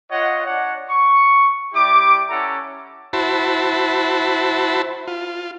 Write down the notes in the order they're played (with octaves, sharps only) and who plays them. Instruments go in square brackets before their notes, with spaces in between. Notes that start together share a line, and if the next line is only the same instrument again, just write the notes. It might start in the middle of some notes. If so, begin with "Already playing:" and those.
[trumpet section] F4 C#5 D#5 F#5
D4 C#5 F#5
C#6
G3 E4 G4 D6
C#4 E4 A4 F#5 A#5
[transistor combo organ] E4 F#4 C5 A5 B5
F4